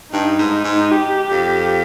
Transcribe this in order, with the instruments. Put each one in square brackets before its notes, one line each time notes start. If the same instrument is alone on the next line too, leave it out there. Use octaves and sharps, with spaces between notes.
[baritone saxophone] G2 [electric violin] D#4
[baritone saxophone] G#2
[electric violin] D#4
[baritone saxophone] G#2
[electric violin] G4
[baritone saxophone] F2